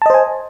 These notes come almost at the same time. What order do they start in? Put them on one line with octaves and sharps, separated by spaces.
A5 D#5 C5 G#5